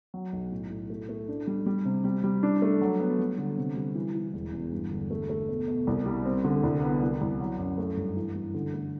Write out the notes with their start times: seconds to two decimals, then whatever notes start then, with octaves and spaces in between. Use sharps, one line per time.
0.14 F#3
0.33 B1
0.52 A2
0.70 A2
0.90 A3
1.09 A3
1.28 D4
1.47 G3
1.66 G3
1.85 C3
2.04 G3
2.24 G3
2.43 D4
2.62 A3
2.81 F#3
3.00 B3
3.19 G3
3.38 D3
3.58 C3
3.76 G3
3.95 E3
4.15 E3
4.34 E1
4.53 E2
4.72 G2
4.91 D3
5.11 A3
5.30 A3
5.49 B2
5.68 B2
5.87 C2
6.06 G3
6.25 C4
6.44 D3
6.63 C2
6.82 B3
7.02 C2
7.21 C2
7.40 F#3
7.59 F#2
7.78 A3
7.97 G2
8.16 E3
8.36 G3
8.54 D3
8.74 A3